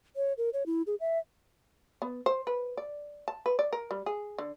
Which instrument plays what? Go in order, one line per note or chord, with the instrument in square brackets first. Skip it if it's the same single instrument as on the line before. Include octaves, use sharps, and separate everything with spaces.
[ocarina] C#5
A#4
C#5
E4
G#4
E5
[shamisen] B3
C5
B4
D5
A5
B4
D5
A#4
G3
G#4
D3